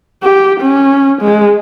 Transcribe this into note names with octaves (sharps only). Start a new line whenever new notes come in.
G4
C#4
G#3